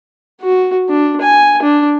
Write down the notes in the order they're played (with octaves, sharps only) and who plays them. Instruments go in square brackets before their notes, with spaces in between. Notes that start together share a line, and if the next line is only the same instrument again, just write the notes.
[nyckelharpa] F#4
D4
G#5
D4